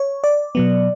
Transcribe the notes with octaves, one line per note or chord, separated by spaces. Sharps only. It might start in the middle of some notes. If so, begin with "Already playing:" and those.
Already playing: C#5
D5
B2 F#3 B3